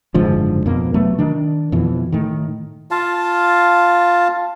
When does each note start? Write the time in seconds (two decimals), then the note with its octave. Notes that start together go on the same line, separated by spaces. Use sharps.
0.14 F#1 G#2 D3 F3
0.66 F2 B2 A#3
0.94 C3 F#3 A3 B3
1.19 D#3 D4
1.72 F2 B2 E3
2.12 A2 D#3
2.91 F4 F5 A5